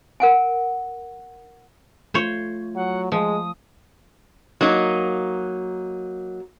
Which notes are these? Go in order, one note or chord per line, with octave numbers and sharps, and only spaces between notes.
A#4 F#5 G#5
A3 F4 C5 C#5
F#3 F#5
F3 G#3 D#6
F#3 A#3 D#4